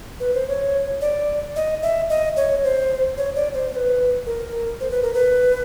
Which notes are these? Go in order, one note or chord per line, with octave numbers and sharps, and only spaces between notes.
B4
C5
C#5
D5
D#5
E5
D#5
C#5
C5
C#5
D5
C5
C5
B4
A#4
C5
B4
A#4
B4